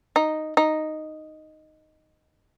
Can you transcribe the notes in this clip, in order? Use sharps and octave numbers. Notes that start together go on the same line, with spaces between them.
D#4
D#4